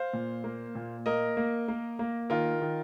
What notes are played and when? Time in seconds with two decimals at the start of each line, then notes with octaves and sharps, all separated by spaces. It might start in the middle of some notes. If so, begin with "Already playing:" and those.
Already playing: C5 F5
0.13 A#2
0.44 A#3
0.75 A#2
1.06 A#3 A#4 D#5
1.37 A#3
1.68 A#3
1.99 A#3
2.30 D#3 F4 A#4
2.62 D#3